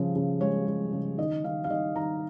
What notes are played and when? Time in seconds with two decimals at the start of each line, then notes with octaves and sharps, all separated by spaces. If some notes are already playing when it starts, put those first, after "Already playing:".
Already playing: C#3 F3
0.16 C#3
0.40 G#3 C#5
0.67 G#3
0.93 C#3
1.18 D#3 D#5
1.44 D#3 F5
1.64 F5
1.70 D#3 D#5
1.96 D#3 A#5